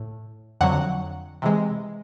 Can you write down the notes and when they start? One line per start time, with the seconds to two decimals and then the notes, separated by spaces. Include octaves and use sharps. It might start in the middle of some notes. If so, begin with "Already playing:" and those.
Already playing: A2
0.61 F2 D3 F#3 F#5
1.42 C3 E3 G#3